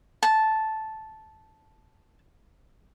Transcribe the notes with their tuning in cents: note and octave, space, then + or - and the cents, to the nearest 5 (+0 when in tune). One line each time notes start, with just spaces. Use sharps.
A5 -5